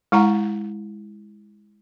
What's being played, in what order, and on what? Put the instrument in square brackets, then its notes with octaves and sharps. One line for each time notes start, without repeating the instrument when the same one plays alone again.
[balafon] G#3 E4 F#5 A#5